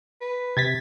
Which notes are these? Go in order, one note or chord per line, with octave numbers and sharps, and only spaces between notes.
B4
C3 G#6 A6 B6